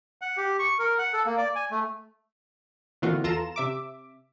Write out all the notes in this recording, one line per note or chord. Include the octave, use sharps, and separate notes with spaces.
F#5
G4
C#6
A#4
F#5
A4
A#3
D5
G#5
A3
A#2 D3 E3 C4 F4 F#4
E2 F4 A4 A#5 E7
C3 E5 D6